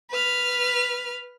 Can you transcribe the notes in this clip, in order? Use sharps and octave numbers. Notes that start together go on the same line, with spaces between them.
B4 F6